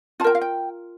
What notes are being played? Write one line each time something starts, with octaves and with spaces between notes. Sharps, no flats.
F4 A#4 G5 A5
F5
G5